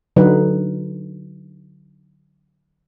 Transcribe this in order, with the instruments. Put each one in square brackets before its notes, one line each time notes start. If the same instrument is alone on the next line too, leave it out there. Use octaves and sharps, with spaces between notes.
[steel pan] D3 F#3 D#4 B4